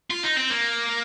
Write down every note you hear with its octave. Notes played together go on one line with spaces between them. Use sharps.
F4
D#4
C4
A#3